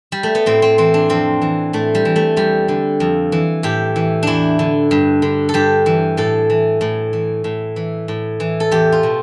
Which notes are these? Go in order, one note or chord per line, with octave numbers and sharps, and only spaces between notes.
G3
A3
B3
A2 C4
C4
E3 C4
D4
F2 C4
E3
A2 A3
G3
E3
A3
E2 G3
D3
F2
E3
A2 G4
E3
E2 D4 E4
D3
G2
D3
A4
G2 G4
E3
A2 A4
E3
A2
E3
A2
E3
A2
E3
A4
E2 G4
F4
B2